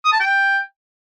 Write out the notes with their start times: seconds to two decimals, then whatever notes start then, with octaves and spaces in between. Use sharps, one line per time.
0.05 D#6
0.12 A5
0.20 G5